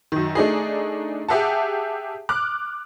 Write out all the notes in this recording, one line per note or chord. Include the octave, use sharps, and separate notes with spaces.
F#2 D#3
A3 D4 D#4 G#4
G4 G#4 E5 F#5 A5
D6 F6 F#6